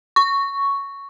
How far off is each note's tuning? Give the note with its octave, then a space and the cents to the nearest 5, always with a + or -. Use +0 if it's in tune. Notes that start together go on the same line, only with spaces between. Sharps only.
C#6 +5